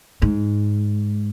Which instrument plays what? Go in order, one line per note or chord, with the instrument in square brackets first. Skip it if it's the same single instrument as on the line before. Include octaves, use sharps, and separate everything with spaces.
[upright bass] G#2